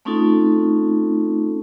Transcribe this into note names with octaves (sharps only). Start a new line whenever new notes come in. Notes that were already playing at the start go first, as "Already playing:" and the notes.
A3 C4 C#4 D#4 F4 A4